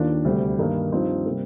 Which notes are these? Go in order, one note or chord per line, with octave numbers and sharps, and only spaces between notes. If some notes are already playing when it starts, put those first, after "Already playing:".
Already playing: D#2 D#3 A#3 D4 F4
D2 C3 G3
G2 D#3 A#3 D#4
G2 F3 C4 D#4
C3 G3 A#3